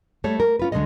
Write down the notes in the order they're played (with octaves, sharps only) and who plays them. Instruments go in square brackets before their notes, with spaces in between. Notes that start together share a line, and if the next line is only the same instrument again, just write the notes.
[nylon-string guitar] G3 A3 C#5
A#4
C#4 F4 B4
D2 D3 F3 G#3 C#4 D#5